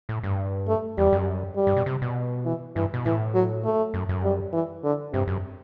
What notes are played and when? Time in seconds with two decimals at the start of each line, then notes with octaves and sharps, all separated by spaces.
0.09 A2
0.23 G2
0.68 A3
0.98 E2 G3
1.12 F#2
1.56 G3
1.67 G2
1.77 B2
1.86 C3
2.02 B2
2.45 E3
2.76 G2 E3
2.94 B2
3.06 A2 E3
3.35 F#3
3.65 A3
3.94 F#2
4.09 F#2
4.24 G3
4.53 E3
4.84 D3
5.13 G2 C3
5.27 F#2